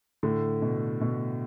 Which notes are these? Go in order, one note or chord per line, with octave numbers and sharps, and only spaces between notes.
A2 D3
B2
B2